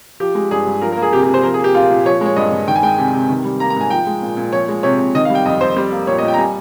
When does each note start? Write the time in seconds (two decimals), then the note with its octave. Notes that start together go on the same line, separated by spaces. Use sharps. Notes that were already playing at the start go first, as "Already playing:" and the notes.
0.20 F3 G4
0.35 G#3
0.51 G2 G#4
0.66 G2
0.82 F3 A#4
0.92 A#4
0.97 A#3
1.02 G#4
1.13 C3 G4
1.23 G4
1.28 C3
1.34 C5
1.43 F3 A#4
1.54 G#4
1.59 A#3 G4
1.75 A#2 F4
1.90 A#2
2.05 F3 C#5
2.21 G#3 C#5
2.36 G2 D#5
2.52 G2
2.68 D#3 G5
2.76 G#5
2.83 G#3 G5
2.98 C3 G#5
3.14 C3
3.29 D#3
3.45 G3
3.60 A#3 A#5
3.70 A#5
3.76 G#2 G#5
3.90 F3 G5
4.06 G#3
4.22 A#2
4.37 A#2
4.53 F3 C#5
4.68 G#3
4.83 C3 C#5
4.99 C3
5.15 D#3 D#5
5.25 F5
5.30 G3 G5
5.46 F2 D#5
5.61 F2 C5
5.76 G3 G4
5.92 A#3
6.07 A#2 C#5
6.18 D#5
6.23 A#2
6.28 G5
6.34 A#5
6.38 G3 G#5